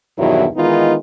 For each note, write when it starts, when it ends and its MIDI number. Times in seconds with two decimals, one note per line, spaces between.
0.18 0.45 40
0.18 0.45 43
0.18 0.45 47
0.18 0.45 51
0.18 0.45 54
0.18 0.45 64
0.56 0.95 51
0.56 0.95 52
0.56 0.95 56
0.56 0.95 59
0.56 0.95 63
0.56 0.95 65